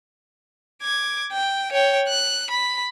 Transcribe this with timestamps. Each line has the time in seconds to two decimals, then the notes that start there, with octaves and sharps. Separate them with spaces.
0.82 D6 G#6
1.32 G5
1.72 C#5 G5
2.08 F#6
2.51 B5